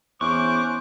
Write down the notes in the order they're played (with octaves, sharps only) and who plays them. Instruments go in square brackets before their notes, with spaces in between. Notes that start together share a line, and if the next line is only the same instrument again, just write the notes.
[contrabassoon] E2 [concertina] C#4 C5 F#6 [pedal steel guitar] C#6 [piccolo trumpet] D6